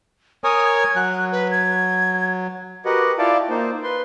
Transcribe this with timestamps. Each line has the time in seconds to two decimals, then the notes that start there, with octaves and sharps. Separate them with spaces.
0.44 A#4 C#5 G#5 D#6
0.64 G#6
0.96 F#3 F#6
1.32 B4
1.51 G#6
2.85 F#4 G4 A#4 B4 D#5 F#5
3.19 E4 F4 D5 F5 G5 A5
3.49 A#3 D#4 C5
3.84 B4 C6